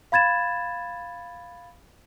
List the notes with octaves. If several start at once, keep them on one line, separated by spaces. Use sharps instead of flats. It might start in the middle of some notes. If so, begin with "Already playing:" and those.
F5 B5 G#6 A6 E7